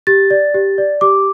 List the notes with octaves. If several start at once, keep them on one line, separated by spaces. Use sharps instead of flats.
G4 A6
D5
G4
D5
G4 D6